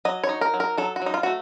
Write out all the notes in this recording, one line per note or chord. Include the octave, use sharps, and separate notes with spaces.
F#3 D#5
C#5
D#4
A#4
F#3
A#4
F#3 A4
F#4
F#3 D#4
F4
A3 F#4